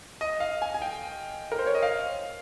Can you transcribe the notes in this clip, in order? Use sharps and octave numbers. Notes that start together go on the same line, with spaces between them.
D#5
F5
G#5
G#5
G5
A#4
C5
C#5
D#5
F5